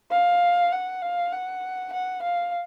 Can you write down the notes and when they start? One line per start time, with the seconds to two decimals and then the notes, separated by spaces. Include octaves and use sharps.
0.11 F5
0.72 F#5
1.02 F5
1.32 F#5
1.93 F#5
2.22 F5